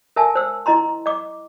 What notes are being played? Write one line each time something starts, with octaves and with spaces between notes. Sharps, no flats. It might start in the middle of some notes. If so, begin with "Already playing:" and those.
A#4 E5 G#5 A5
C5 E6
E4 D#5 A#5 C6
D#5 D6